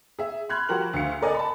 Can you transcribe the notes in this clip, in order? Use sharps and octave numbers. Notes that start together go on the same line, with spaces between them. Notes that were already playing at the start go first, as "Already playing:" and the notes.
G#4 E5
B5 C6 F6 F#6 G#6
F3 F#4 G4 A#4 F#7
D2 F5 C#7
A4 A#4 D5 D#5 G#5
A5 B5